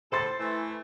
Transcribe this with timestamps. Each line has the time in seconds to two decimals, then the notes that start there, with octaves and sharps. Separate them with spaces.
0.12 A2 A4 C5 C6 A6
0.40 E3 A3